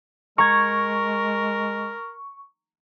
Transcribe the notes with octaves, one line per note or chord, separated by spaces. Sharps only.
G#3 A#4 A#5 C#6 G#6